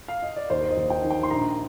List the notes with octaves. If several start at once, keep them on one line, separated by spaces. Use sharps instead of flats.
F5
D#5
D5
D#2 C5
D#5
D#2
G5
D#3
G5
C6
A#1 A#5